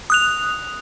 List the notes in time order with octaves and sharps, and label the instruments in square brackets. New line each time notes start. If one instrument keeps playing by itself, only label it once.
[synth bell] D#6 F#6 F7